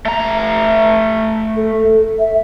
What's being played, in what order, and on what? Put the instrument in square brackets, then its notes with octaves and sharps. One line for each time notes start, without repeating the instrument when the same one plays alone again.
[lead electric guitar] A3 A#5
[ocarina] A4
E5